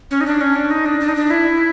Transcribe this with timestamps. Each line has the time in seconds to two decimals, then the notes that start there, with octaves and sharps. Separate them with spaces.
0.11 C#4
0.21 D#4
0.26 D4
0.41 C#4
0.56 D4
0.71 D#4
0.86 D4
1.01 D4
1.09 D#4
1.15 D4
1.30 E4